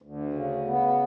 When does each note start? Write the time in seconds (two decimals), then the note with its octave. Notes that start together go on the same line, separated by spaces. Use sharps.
0.02 D2
0.34 C#3
0.66 B3